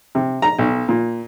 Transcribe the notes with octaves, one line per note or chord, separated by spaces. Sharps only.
C3
A#5
B1
A#2